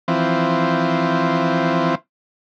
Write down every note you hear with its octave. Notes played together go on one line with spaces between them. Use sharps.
E3 F3 C4